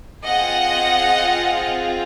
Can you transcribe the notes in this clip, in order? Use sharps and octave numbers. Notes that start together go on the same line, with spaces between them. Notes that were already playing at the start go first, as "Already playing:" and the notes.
C4 F4 G#4 D#5 F#5